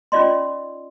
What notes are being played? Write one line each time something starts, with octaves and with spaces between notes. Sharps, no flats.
C#4 D#4 F4 D5 D#5 C6